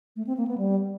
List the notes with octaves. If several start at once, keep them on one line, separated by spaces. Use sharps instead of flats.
A3
C4
A#3
B3
G3